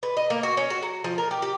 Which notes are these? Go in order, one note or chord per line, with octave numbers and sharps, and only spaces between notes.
B4
D#5
A#3
F#4
C#4
F#4
F#3
F3
A#4
G4
G4